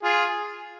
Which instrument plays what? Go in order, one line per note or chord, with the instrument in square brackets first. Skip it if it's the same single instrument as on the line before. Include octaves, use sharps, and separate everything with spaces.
[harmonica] F4 G#4